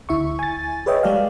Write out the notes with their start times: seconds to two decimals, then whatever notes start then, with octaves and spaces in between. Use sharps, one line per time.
0.09 D2 E4 E5 C#6
0.39 G#5 A6
0.86 G#4 B4 C#5 D#5 E5 G5
1.03 G3 G#3 G4 A4 D5 F5